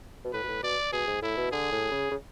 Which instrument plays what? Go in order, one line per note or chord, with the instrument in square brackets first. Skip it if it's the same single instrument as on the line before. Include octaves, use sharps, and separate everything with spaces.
[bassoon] B2
[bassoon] A2 [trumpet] B4
[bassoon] B2
A2
[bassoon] B2 [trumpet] D5
[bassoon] B2 [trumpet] G#4
[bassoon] G#2
[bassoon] A2 [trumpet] E4
[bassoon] B2
[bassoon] D3 [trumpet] G#4
[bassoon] A2
C#3
C#3